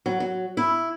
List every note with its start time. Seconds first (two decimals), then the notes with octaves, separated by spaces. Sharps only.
0.06 F#3
0.20 F#3
0.57 E4